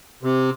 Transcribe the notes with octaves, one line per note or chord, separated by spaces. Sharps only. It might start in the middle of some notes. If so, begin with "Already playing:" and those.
C3